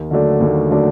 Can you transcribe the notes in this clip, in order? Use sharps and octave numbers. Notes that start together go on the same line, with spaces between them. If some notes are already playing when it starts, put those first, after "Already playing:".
Already playing: D#2
D3 F#3 A3 D4
D#2
D3 F#3 A3 D4